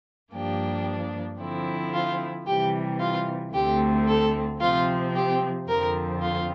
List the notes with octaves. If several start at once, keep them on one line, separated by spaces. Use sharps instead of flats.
G2 F3 A#3 D4 G4
D3 F3 C4 E4
F4
C3 E3 G3 G4
F4
D2 D3 A3 C4 G4
A4
C3 F3 C4 F4
G4
F2 D3 F3 C4 A#4
F4